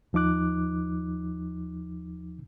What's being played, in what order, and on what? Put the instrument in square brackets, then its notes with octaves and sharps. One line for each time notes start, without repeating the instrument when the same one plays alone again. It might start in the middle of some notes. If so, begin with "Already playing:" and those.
[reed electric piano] D#2 F3 D#4 D6 F#6